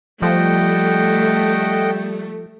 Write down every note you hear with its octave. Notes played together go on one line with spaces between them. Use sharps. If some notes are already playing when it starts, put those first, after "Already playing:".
F3 G3 A3 D#5 F#5 G5